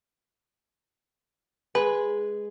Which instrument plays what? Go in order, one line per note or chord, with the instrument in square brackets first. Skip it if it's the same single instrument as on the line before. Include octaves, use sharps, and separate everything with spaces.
[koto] G#3 [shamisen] B4